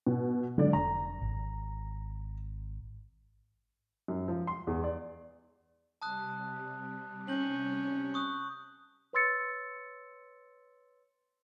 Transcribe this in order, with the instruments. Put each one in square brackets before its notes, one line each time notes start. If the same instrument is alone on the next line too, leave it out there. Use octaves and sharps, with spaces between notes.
[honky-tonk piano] B2
[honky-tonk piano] D3 D5 [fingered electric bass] F#3 G#3
[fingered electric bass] F1 [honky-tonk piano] A#5
[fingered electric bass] G#1
[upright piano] F#2
F3
C6
E2
D5
[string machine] C3 G3 [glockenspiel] A5 D#6 F#6
[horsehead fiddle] C#4 [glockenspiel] G6 F#7
[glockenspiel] C#6 D#6 F#6
[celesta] B4 C#5 C6 E6 A6 C#7